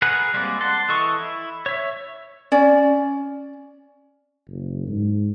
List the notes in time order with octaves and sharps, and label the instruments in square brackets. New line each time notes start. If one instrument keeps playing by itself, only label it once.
[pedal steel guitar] G#4 A#4 B4 F#5
G3 G#3 A#3 C4 D5
F#5 A5 C6
E3 A4 D#5 C#6
E4
C#5 E5
[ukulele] C#4 D5
[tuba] F#1
G#2